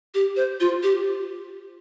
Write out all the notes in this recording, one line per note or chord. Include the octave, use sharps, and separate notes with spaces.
G4
C5
F4
G4